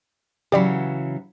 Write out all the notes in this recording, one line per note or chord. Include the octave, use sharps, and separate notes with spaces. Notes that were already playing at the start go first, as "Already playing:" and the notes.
C#3 E3 F#3 G4 D5 B5